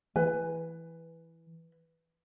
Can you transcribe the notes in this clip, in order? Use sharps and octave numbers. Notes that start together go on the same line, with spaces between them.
E3 B4 G#5